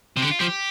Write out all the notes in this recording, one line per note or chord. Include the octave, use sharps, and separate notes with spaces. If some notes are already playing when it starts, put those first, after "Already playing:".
C3
D3 G4
F4
F3 G4